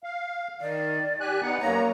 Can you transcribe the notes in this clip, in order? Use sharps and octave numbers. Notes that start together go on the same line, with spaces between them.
F5
D#3 D5
G4 G#5 F#6
B3 D#4 F#5
F#2 A#3 C#5 A#5